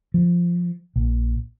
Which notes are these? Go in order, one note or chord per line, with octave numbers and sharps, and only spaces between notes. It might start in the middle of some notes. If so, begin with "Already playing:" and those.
F3
A#1